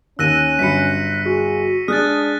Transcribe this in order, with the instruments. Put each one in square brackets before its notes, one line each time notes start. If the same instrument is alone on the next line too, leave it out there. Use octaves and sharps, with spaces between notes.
[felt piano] D#2 [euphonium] C#4 [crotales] E6 A#6 D#7 [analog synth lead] F#6
[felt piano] G1 F#3 B5 [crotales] B6 C#7
[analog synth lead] F#4 [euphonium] G#4
[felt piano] G#3 [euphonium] D4 [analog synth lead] D#6 [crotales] F6 F#6 A6